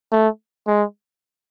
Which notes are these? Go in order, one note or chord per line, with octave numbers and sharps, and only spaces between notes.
A3
G#3